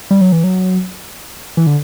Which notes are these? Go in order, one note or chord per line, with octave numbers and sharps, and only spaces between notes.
G3
F#3
E3
F#3
E3
D3